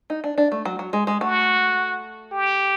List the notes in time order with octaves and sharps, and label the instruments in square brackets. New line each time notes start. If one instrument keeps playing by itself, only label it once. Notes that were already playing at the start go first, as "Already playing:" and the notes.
[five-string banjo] D#4
D4
D4
A3
F#3
F#3
G#3
G#3
[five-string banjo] A3 [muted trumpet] F#4
[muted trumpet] G4